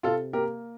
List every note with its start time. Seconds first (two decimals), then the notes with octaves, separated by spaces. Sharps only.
0.03 C3 F4 A4
0.33 A#3 G4 A#4